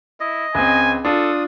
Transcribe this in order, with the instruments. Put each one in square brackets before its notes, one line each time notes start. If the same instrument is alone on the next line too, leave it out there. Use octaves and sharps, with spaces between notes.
[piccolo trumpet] E4 [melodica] D#5
[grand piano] C#2 C4 [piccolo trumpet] G#5
[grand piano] D4 F4 [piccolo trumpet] A4 [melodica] D#6